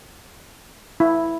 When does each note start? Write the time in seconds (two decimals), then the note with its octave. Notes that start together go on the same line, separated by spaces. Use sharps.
1.00 E4